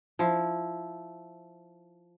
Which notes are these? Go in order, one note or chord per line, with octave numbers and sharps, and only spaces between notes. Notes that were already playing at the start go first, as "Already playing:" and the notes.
F3 E4